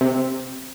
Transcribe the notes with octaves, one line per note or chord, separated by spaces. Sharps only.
C3